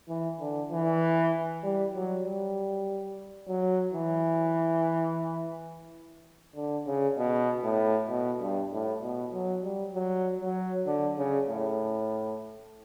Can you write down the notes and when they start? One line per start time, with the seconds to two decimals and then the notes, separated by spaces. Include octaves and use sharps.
0.09 E3
0.40 D3
0.71 E3
1.64 G3
1.94 F#3
2.25 G3
3.48 F#3
3.94 E3
6.56 D3
6.86 C#3
7.18 B2
7.64 A2
8.09 B2
8.40 G2
8.72 A2
9.02 B2
9.33 F#3
9.64 G3
9.95 F#3
10.41 F#3
10.87 D3
11.18 C#3
11.49 A2